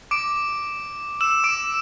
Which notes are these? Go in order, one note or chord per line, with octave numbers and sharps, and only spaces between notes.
D6 D7
E6 E7
D6 D7